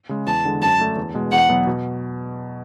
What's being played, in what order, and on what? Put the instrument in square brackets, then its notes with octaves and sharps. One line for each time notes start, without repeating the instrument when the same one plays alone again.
[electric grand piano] C#3 G#3
[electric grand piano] E2 [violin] A5
[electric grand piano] D3 G#3
[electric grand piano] F#2 [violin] A5
[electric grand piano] D3 A3 D4
E2
B2 G#3
[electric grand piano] E2 [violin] F#5
[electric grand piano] B2 F#3 B3
B2